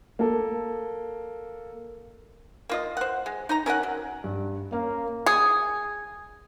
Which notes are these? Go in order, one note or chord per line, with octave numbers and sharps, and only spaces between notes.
A#3 A4
A#3 F4 D#5
C5 F#5
G#3
D#4 D#5 A#5
C#4 A#4 D#5 F#5
F#3
G2
A#3 C#4 F5
G#4